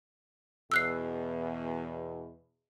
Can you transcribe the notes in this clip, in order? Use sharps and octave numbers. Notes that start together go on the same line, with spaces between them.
E2 B2 E6 F#6 C7